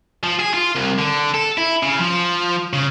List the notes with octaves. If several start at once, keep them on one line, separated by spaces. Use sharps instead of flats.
F3
G#4
F4
C2
D3
A4
E4
C#3
F3
C#3